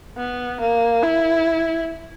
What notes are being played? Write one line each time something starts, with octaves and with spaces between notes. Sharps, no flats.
B3
A#3
E4